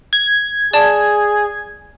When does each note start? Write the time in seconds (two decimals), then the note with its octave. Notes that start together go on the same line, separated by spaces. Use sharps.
0.13 G#6
0.73 G#4 D5 A5